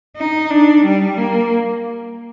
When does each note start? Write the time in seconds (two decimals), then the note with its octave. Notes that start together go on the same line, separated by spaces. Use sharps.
0.17 D#4
0.50 D4
0.84 G3
1.17 A#3